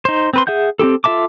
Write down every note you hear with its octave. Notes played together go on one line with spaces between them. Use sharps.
D#4 C5
C4 B4 C6
G#4 E5 F#5 G6
C4 E4 G4 A4
F4 A4 E5 A5 D6